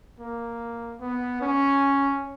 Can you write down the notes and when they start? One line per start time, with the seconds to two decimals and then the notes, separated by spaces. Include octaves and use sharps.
0.20 A#3
1.01 B3
1.41 C#4